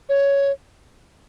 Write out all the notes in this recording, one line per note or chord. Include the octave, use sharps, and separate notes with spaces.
C#5